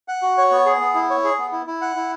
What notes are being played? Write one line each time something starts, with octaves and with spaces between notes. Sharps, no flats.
F#5
F#4
C#5
B3
G#4
B3
E4
C#5
G#4
B3
E4
E4
F#5
E4